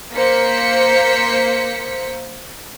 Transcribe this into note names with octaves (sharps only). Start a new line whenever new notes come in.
A#3 C5 B6 C#7